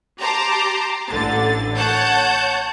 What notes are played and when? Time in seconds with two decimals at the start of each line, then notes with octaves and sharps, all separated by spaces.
0.19 G4 A5 A#5 C6 D6
1.09 A1 D3 A6
1.76 C#5 F#5 A5 G6